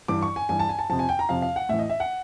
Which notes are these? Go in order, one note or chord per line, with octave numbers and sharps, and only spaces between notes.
G2 E3 D6
C#6
G#5
G2 E3 G#5
A5
G#5
A5
F2 C3 F3 A5
G#5
G5
A#5
F2 C3 F3 F5
F5
F#5
A2 E3 E5
D#5
E5
F#5